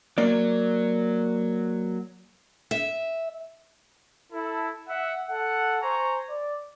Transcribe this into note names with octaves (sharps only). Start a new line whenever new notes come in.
F#3 A#3 D5
E5
E4 A4
E5 F#5
A4 F#5
C5 G#5 A#5 C#6
D5